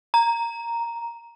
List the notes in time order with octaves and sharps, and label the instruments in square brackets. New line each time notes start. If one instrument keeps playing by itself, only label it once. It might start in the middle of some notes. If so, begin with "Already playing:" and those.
[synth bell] A#5